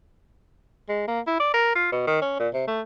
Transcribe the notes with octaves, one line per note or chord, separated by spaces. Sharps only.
G#3
A#3
E4
D5
A#4
F4
B2
D#3
C#4
A#2
C3
A3